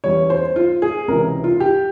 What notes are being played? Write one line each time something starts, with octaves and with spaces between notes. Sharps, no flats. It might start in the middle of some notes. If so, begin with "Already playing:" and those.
E2 E3 G3 C#4 C#5
C5
F4
G#4
C#2 C3 E3 A#4
F4
G4